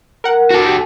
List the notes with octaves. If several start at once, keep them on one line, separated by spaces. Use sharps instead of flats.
A#4 F#5
F#4 A4
G4